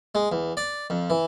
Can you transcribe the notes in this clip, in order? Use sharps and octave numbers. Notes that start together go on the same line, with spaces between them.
G#3
E2
D5
F2
E3